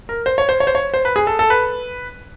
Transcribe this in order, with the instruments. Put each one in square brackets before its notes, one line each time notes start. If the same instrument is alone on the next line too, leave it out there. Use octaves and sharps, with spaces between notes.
[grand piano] A#4
C5
C#5
C5
C#5
C5
C#5
C5
B4
G#4
A4
A4
B4